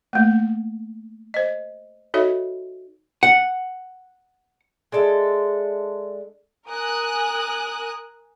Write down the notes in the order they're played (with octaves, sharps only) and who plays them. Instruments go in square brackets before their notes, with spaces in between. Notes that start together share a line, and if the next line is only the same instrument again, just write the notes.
[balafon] A3 A#3
C5 D#5
D#4 F#4 A4 C#5 D#5 E5
[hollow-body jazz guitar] F#5
[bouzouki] G#3 D4 A4 E5
[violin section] A#4 G#5 D#6 F#6